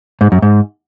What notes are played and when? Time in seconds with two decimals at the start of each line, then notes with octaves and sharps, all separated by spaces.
0.21 G#2
0.32 F#2
0.42 G#2